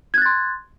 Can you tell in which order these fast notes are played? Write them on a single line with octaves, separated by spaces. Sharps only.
G#6 F#6 A6 C6